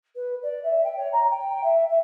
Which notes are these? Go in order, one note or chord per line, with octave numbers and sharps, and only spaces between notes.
B4
D5
E5
G5
C#5
A#5
G5
E5
E5